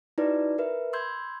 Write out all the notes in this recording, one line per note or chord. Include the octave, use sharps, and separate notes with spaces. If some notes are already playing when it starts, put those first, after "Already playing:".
D#4 E4 F#4 B4 C#5 D5
A#4 B4 E5
B5 C6 E6 G6 G#6